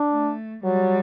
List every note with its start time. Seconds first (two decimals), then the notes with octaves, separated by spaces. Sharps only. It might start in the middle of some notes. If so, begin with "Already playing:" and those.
Already playing: D4
0.12 A3
0.63 F#3 G3